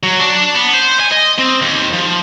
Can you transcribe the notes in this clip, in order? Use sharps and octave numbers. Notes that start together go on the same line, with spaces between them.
F#3
D4
B3
C5
G#5
D#5
C4
D#2
F3